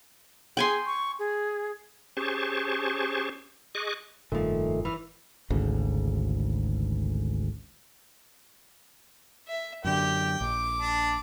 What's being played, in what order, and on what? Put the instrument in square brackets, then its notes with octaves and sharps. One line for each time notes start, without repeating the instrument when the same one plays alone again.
[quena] G#4 [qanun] G5 G#5 C6
[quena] C#6
G#4
[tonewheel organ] C#4 G4 G#4 C5 A5 C#6
G#4 D#5 C#6 D6 F#6
[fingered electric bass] F1 G2 [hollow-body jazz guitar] A#2 F3 [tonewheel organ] D#3 A3
[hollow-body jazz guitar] E3 [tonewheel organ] B4 F6
[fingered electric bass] G#1 D2 C#3
[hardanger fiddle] E5
[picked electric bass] F#2 D3 [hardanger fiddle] G4 [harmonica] G5
[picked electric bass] A#1 [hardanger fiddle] D6
[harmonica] D4